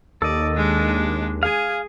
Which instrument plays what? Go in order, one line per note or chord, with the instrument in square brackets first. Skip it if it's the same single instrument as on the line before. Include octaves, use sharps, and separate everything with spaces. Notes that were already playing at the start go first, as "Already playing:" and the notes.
[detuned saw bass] D#2 [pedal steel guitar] A4 D#5 [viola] D5
[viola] G#3 D4
[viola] G#4 [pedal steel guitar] F5 G#5